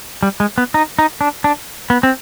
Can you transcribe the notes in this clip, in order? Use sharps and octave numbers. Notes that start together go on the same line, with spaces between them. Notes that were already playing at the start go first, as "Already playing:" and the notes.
G3
G#3
B3
D#4
D#4
D4
D4
B3
C4